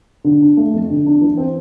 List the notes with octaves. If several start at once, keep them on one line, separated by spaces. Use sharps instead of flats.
D3
D4
A3
F2
D3
D4
E3
C4